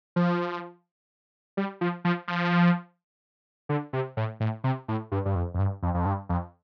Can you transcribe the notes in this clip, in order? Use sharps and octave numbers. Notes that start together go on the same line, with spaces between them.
F3
G3
F3
F3
F3
D3
C3
A2
A2
C3
A2
G2
G2
F2
F2
G2
F2
F2
G2
F2